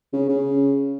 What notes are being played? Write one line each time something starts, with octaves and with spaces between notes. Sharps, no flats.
C#3
C#3